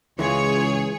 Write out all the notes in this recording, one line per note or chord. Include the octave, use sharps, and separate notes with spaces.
C#2 E3 G#3 F4 G#4 C#5 C#6